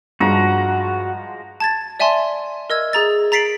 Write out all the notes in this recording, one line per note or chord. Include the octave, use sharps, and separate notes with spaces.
G2 F3 G#3 F#4 A#5
A5 G#6 A6
D5 E5 G#5 A5 C6
A#4 D#5 E6 G#6
G#4 A#5 A6
A#5 A6 B6 C7 D7 F#7